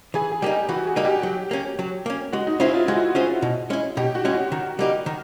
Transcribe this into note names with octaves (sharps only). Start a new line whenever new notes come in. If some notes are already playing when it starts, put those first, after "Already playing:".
E3 G#4
G#4
G3 A#3 D#4 G4
E3 F#4
G#4
G3 A#3 D#4
G4
F#3
A#3 C#4
F#3
A#3 C#4
G#3 F#4
D#4
C#4 E4 F4 G#4 C5
F4
G#3 F#4
C#4 F4 G#4 C5
B2
G#3 C#4 E4
B2 G4
F#4
G#3 C#4 E4
F#4
D#3
G3 A#3 D#4 G4
D#3